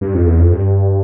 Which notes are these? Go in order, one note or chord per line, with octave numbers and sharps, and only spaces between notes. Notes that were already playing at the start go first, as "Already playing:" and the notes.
G2
F2
E2
F2
G2